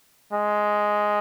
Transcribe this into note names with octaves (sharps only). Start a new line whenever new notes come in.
G#3